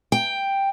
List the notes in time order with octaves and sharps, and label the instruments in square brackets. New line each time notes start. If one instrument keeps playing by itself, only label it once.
[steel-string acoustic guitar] G5